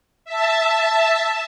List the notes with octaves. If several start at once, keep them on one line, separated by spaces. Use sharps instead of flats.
E5 A5